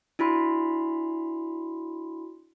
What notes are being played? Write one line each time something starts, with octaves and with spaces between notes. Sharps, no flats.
D4 E4 F#4 B5 C6